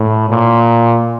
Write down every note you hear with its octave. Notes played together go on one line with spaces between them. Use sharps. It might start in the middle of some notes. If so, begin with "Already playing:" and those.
Already playing: A2
A#2